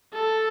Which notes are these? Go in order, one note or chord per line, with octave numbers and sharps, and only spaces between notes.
A4